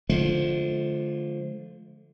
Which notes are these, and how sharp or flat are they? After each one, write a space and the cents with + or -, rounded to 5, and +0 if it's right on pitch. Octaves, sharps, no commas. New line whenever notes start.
D3 +0 F3 +0 G#3 +45